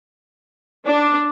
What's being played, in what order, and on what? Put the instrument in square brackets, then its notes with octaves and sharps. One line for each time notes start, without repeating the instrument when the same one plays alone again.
[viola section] D4